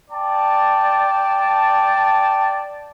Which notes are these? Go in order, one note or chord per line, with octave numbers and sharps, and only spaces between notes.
D5 G5 A5